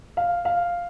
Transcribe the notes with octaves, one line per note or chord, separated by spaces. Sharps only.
F5
F5